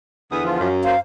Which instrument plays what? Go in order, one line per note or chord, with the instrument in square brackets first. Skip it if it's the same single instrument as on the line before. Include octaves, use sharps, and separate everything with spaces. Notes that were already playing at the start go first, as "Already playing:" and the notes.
[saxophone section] E2 D3 B3 [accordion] D#6
[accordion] F3 F4
[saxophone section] F#2
[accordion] A#3 C5 [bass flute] F5